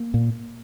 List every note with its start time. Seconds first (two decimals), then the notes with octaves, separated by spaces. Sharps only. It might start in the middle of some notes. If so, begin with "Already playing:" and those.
Already playing: A#3
0.14 A#2